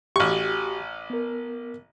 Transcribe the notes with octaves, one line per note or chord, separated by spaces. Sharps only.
A1 F#4 G4 C#6
B3 A#4